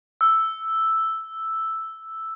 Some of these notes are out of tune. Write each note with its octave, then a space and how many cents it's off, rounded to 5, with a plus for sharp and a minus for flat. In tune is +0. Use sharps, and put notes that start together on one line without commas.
E6 +0